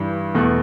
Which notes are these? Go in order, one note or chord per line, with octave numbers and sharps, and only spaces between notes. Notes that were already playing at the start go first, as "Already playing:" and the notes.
Already playing: G2 E3 G3
E2 B2 A3